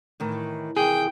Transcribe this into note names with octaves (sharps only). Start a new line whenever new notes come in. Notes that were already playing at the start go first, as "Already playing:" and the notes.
A2 D#3 E3
C3 D#3 E3 G#4 G5